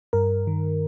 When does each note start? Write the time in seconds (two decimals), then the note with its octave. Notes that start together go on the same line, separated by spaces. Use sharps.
0.13 G2 A#4
0.47 D#3